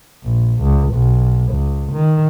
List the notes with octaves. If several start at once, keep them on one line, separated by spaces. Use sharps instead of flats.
A#1
C#2
B1
C#2
D#3